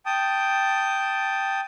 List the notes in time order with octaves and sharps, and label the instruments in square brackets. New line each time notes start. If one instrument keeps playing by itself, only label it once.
[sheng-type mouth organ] G5 A5 D#6